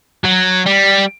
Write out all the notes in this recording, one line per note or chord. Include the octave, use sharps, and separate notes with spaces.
F#3
G3